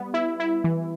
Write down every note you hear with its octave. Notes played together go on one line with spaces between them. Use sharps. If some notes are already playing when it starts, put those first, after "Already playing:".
Already playing: G3 B3
E4
E4
E3